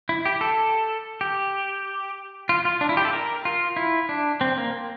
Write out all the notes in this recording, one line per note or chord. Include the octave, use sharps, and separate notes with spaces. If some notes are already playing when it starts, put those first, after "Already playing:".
E4
G4
A4
G4
F4
F4
D4
E4
G4
A4
A#4
F4
E4
D4
C4
A#3